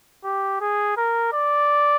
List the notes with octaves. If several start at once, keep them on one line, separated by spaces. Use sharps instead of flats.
G4
G#4
A#4
D5